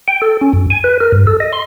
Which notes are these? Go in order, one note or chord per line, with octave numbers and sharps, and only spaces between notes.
G5
A4
C#4
F#2
G#5
B4
A#4
G2
A4
D#5
C6